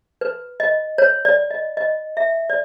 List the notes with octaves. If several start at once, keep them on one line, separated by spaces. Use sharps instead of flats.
B4
D#5
C#5
D5
D#5
D#5
E5
D5